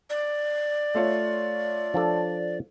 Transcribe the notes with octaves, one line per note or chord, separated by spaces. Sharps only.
D5
A3 F4 C#5
F3 D4 A4